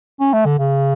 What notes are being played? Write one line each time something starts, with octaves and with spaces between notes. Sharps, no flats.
C#4
A3
D3
C#3